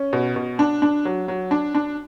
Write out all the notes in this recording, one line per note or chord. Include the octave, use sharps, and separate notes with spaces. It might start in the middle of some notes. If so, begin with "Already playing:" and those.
Already playing: C#4
B2
B2
D4
D4
F#3
F#3
D4
D4